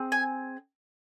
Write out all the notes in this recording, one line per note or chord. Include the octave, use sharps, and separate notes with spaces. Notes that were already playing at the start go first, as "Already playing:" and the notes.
Already playing: C4 G#4
G#5